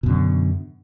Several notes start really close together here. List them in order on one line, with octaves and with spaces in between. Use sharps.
B2 F#2 D3